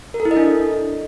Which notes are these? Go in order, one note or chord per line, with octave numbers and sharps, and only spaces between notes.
A#4
A4
E4
D#5
D4